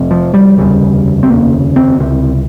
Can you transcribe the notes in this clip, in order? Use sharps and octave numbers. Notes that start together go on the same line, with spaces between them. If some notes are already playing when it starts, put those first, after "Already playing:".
Already playing: F1 F2 C3
F3
G3
F1 D#2 C#3 G3
C4
F1 D#2 C#3 A#3
C4
C#2 C3 C4